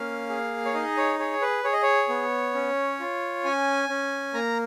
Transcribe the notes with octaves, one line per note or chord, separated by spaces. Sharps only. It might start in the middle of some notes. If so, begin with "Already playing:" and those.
Already playing: A#3 C#4 F5
G#4
C#5
D#4 D#5
C#5
G#4 C#5
B4
G#4 C#5
D#5
C#5
B3
C#4
F4
C#4 G#5
C#4
A#3 A#5